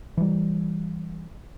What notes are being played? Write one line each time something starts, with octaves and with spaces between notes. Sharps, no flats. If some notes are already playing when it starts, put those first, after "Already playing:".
E3 G3